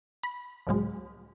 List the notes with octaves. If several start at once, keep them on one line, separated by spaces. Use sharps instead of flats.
B5
C#2 A2 F#3 G#3